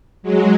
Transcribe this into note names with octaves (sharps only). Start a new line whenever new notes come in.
F#3 G#3